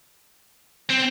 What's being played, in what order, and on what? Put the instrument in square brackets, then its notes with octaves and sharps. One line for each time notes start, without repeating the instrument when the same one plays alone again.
[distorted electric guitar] C4